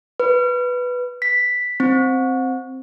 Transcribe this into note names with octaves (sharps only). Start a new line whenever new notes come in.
B4
B6
C4